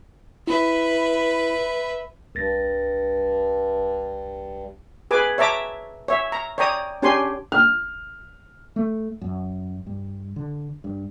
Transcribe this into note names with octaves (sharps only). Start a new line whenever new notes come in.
E4 B4 E5
C2 G2 A6 A#6
G#4 B4 G#5 D6
C#5 E5 A5 A#5 D6
C#5 E5
A#5
C#5 D5 G5 A#5 D#6
C#4 D4 G4 C#5 G#5 C6
F6
A3
F#2
G2
D3
G2